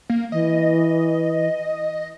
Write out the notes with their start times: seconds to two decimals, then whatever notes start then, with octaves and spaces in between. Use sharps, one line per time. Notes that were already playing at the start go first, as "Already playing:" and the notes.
0.10 A#3
0.32 E3 D#5